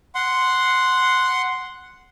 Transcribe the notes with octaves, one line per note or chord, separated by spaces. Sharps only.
F#5 C6